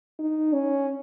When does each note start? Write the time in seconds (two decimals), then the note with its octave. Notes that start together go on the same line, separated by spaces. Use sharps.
0.19 D#4
0.53 C#4